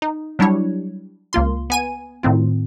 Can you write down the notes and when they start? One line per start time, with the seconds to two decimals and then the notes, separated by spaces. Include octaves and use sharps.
0.02 D#4
0.39 F#3 G3 D4 E4 C#5
1.33 C#2 A#3 F4 C6
1.70 B3 G#5 D#7
2.23 A2 D#3 C4 F4